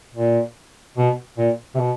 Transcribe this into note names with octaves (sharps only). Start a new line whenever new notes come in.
A#2
B2
A#2
C3
B2